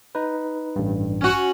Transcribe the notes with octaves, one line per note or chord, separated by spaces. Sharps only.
D#4 B4
A1 G2
C#4 F#4